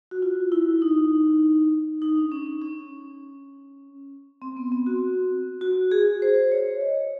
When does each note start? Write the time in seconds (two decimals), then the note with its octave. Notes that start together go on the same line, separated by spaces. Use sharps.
0.11 F#4
0.22 F4
0.52 E4
0.82 D#4
2.02 D#4
2.17 D4
2.32 C#4
2.47 C#4
2.62 C#4
4.42 C4
4.57 B3
4.72 C4
4.86 F#4
5.61 F#4
5.92 G#4
6.22 C5
6.52 C#5
6.81 D#5